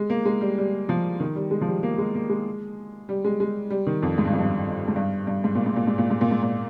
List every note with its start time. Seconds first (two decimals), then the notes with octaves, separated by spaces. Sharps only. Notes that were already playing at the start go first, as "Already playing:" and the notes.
Already playing: G#3
0.10 A#3
0.25 G#3
0.41 G3
0.58 G3
0.89 F3
1.20 D#3
1.35 G3
1.51 G#3
1.61 F3
1.68 G3
1.83 A#3
1.98 G#3
2.15 A#3
2.30 G#3
3.09 G3
3.25 G#3
3.40 G#3
3.70 G3
3.87 D#3
4.02 F2
4.18 G#2
4.25 G2
4.33 F2
4.39 G2
4.88 G#2
4.96 G2
5.27 G2
5.44 G#2
5.55 A#2
5.66 G#2
5.76 A#2
5.87 G#2
5.98 A#2
6.10 G#2
6.21 A#2
6.31 G#2
6.43 A#2